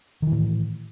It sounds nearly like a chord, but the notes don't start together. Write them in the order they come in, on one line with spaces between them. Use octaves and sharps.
D#3 E3 A2